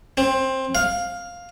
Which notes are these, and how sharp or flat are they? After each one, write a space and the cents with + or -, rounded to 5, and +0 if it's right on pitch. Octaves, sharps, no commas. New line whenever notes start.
C4 +15
F5 +10